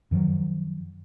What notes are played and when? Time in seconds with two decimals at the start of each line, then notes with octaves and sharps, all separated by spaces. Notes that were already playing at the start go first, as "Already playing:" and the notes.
0.11 F#2 D#3 F3 F#3